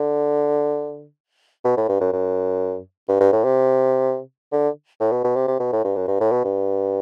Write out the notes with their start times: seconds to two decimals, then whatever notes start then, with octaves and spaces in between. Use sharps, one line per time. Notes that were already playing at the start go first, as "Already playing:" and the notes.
Already playing: D3
1.64 B2
1.77 A2
1.89 G2
2.00 F#2
2.12 F#2
3.08 G2
3.21 G2
3.33 A2
3.44 C3
4.52 D3
5.00 A2
5.12 B2
5.24 B2
5.36 C3
5.48 C3
5.60 B2
5.72 A2
5.84 G2
5.96 F#2
6.07 G2
6.20 A2
6.31 B2
6.45 G2